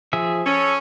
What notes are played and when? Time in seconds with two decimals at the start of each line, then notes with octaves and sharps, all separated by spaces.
0.13 F3 G#4 E5
0.46 C#4 A4